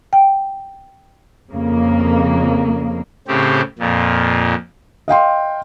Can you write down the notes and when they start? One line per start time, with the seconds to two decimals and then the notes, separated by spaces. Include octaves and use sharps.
0.13 G5
1.51 F2 C#3 A#3
3.28 A2 C#3 C4 G4
3.79 F2 A#2
5.08 D#5 F5 G5 C6